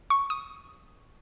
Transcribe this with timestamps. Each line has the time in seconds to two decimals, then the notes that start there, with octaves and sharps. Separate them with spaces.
0.10 C#6
0.30 D#6